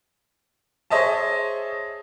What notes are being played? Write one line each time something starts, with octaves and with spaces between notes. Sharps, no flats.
G#4 C5 C#5 D#5 E5 A5